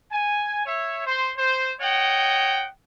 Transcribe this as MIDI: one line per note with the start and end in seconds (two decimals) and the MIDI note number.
0.12 0.62 80
0.65 1.04 73
0.65 1.04 76
1.06 1.31 72
1.06 1.31 84
1.37 1.72 72
1.80 2.68 73
1.80 2.68 75
1.80 2.68 78
1.80 2.68 79